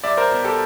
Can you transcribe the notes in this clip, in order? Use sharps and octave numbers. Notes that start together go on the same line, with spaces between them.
C2 D5 E5
A#4 C5
B2
G4 A4